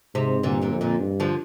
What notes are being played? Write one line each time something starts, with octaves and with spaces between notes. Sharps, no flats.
G#2 C3
G2 A#2 D3
A#2 D3
F2
A#2 D3
G2
D3 F3